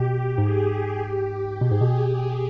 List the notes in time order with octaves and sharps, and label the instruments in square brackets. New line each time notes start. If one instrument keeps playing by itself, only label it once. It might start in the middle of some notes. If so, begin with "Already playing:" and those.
Already playing: [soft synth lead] B2 [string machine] G4
[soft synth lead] G#2 [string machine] G#4
[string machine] G#4
G4
[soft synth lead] B2 [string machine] G#4
[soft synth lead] G#2
B2
[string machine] G4